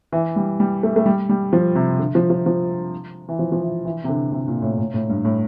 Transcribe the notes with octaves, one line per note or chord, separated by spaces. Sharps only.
E3
G3
G3
A3
A3
G3
G3
F3
C3
D3
F3
F3
F3
E3
F3
F3
E3
E3
C3
D3
C3
A#2
A2
A2
A2
G2
A2